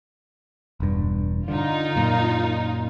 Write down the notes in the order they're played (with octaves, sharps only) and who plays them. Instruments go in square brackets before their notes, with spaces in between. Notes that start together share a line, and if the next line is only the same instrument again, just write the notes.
[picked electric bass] E1 G2
[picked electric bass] D3 [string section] D#4 F4
[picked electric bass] F#2 A#2